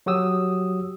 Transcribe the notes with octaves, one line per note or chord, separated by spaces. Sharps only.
F#3 F#4 G4 D#6 E6